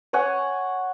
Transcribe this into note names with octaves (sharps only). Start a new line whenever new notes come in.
C#5 F#5 G#5